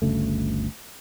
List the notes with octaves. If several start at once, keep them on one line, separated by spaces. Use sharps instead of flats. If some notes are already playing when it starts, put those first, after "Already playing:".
G1 D2 C#3 A3